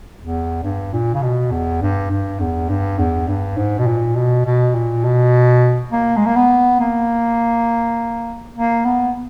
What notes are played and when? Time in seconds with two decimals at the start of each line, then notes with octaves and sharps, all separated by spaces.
0.20 E2
0.64 G2
0.93 A#2
1.14 C#3
1.23 B2
1.51 E2
1.82 G2
2.11 G2
2.40 E2
2.69 G2
2.99 E2
3.28 G2
3.57 G#2
3.78 B2
3.87 A#2
4.15 B2
4.45 B2
4.75 A#2
5.04 B2
5.92 A#3
6.17 G#3
6.26 A#3
6.36 B3
6.81 A#3
8.56 A#3
8.85 B3